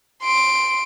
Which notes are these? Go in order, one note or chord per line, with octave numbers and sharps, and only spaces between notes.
C6 D7